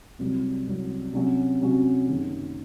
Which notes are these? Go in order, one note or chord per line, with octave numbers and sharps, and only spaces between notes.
C2 C3 F#3
C2 C3 F#3
C3 F#3 C#4 F#4
C3 F#3 C#4 F#4
F#1 F#2 D#3 F#3